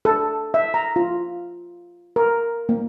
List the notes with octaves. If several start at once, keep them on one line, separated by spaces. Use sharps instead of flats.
A4
E5
A#5
F4
A#4
A#3